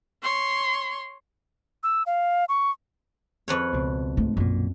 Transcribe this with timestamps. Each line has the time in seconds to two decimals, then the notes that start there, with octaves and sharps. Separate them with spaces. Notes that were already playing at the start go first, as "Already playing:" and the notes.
0.22 C#5 C6
1.83 E6
2.06 F5
2.49 C#6
3.48 F2 B4 C#5
3.73 C#2 B2
4.17 G#2 A3
4.37 B1 F#2 A#2